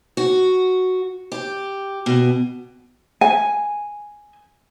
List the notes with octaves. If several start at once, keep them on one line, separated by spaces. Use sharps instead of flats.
F#4
G4
B2
G#5